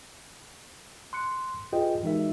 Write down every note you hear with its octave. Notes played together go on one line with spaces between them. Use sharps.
C6 F#6 C#7
F4 G4 G#4 B4 D#5 G5
E3 G#3 D#4 F#4 A#4 E5